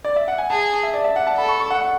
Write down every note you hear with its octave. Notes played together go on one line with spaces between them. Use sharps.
D5
E5
F#5
G#5
G#4 A5
E5
D5
E5
F#5
A5
A4 B5
C#6
C#6
F#5
F#5